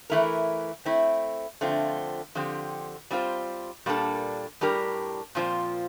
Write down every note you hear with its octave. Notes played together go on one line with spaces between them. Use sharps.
E3 A3 E4 A#4
A3 C4 E4
D3 F3 A3 C4 F4
D3 F3 C4 G4
G3 C4 F4 C5
A#2 G3 A#3 D4 A4
A2 G3 D4 G4 A#4
A#2 F3 C4 F4 C5